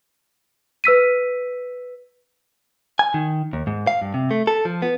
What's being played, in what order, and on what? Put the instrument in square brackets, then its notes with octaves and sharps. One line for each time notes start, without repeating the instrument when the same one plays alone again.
[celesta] B4 E6 B6 D#7
[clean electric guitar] G#5
D#3
D#2
G#2
F5
G2
C3
A3
A4
F3
B3